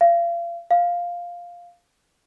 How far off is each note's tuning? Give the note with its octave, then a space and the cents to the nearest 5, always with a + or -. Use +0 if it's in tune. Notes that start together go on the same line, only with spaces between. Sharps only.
F5 -35
F5 +0